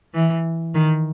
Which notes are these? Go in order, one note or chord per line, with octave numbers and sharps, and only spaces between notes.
E3
D#3